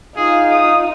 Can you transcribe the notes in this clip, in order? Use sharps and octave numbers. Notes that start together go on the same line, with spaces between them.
D#4 F4 G#4
D#6